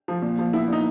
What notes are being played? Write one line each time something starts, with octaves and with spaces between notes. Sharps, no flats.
F3
A#2
F3
B3 E4
A#2 D#4